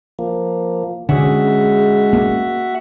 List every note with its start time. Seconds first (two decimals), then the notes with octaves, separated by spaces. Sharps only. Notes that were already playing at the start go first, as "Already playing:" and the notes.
0.19 F3 A#3
1.09 D3 G#3 C#4 F#4 G#4 E5 F#5
2.13 A#3